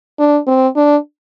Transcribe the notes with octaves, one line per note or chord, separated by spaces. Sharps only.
D4
C4
D4